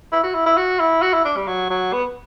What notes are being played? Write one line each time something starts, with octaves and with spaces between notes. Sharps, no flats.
E4
F#4
E4
E4
F#4
E4
F#4
E4
D4
G3
F#3
F#3
B3